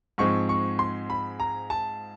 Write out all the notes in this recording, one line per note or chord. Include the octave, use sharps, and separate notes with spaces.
G#2 F3 G#3 C4 C#6
C#6
C6
B5
A#5
A5